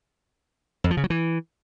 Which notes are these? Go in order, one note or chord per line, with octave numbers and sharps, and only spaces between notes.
F2
F3
C#3
F#3
E3